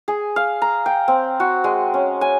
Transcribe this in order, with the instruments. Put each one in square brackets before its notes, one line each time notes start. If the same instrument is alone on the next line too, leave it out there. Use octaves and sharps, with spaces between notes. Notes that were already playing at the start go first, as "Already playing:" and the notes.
[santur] G#4
F5
A#5
G5
C4
F#4
G#3
C#4
G#5